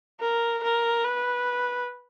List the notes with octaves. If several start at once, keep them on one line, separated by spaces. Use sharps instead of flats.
A#4
A#4
B4